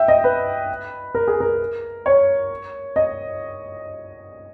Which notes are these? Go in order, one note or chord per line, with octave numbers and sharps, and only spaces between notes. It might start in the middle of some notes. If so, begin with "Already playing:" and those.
Already playing: E5 G5
D#5
B4
A#4
G#4
A#4
C#5
D#5